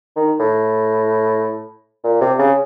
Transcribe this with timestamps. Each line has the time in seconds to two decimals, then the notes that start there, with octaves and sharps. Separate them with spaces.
0.16 D#3
0.39 A2
2.04 A#2
2.21 C3
2.39 C#3